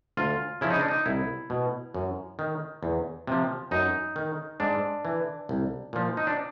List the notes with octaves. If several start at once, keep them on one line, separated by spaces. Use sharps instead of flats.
D2 F4
C#3 F3 E4
D#4
D4
D#4
C2 E4
B2
F#2
D#3
E2
C3 F3
F#2 D#4
D#3
G#2 D4
E3
C2
A#2 F3
D#4
D4